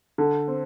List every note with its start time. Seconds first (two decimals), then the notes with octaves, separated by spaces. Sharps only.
0.18 D3
0.48 C4